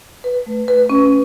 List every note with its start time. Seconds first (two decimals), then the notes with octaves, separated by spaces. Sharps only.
0.24 B4
0.46 A3
0.68 B4
0.90 C#4